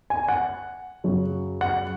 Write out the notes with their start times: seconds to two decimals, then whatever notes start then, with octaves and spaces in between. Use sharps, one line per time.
0.10 G#5
0.28 F#5
1.04 F#2 C#3 F#3
1.61 F#5